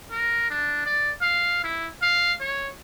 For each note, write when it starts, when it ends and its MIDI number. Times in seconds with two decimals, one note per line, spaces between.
0.11 0.47 70
0.50 0.84 62
0.86 1.12 74
1.21 1.60 77
1.64 1.88 64
2.02 2.33 77
2.41 2.69 73